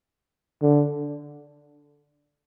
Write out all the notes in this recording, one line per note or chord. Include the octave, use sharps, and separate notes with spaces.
D3